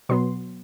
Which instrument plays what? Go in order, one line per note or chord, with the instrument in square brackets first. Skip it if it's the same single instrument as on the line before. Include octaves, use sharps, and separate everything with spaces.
[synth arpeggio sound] B2 F#3 B3 C6